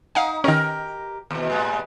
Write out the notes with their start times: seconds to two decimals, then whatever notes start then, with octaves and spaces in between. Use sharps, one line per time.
0.15 D#4 F5 F#5 G#5
0.44 D#3 C#4 G4 A#4
1.31 D#2 B2
1.50 A2 G3 G#3